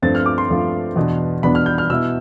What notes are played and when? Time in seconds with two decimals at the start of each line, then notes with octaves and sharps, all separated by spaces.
0.02 G2 F3 A3 C4 F4 A6
0.15 F6
0.26 D6
0.38 C6
0.49 G2 F3 A3 C4 F4
0.96 E2 B2 B3 D4
1.43 E2 B2 B3 D4 B5
1.55 F6
1.66 G6
1.78 F6
1.89 B2 B3 E4 E6